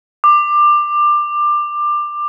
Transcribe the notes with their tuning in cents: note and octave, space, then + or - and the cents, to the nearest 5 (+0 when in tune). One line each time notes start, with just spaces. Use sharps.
D6 +20